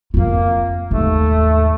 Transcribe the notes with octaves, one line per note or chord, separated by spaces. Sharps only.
F2 A#3 F4
D#2 G#2 A3